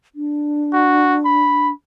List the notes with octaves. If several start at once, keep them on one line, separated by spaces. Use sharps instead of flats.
D4
F#4
B5